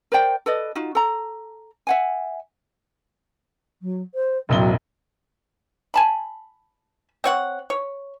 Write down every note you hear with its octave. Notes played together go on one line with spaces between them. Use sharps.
A#4 C5 D5 G5
A4 B4 D5 D#5
D#4 F4 F#4
A4 A#5
E5 F#5 G#5
F#3
C5
E1 A1 F#3 G7
G#5 A5 B5
C4 C#5 F#5
C#5